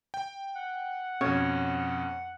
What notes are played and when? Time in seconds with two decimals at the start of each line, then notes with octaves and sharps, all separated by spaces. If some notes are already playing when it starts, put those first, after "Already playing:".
0.14 G5
0.56 F#5
1.21 F2 B2 C#4 C#5